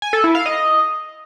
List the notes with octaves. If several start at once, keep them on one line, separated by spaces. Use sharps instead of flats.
G#5
A4
E4
F5
D#5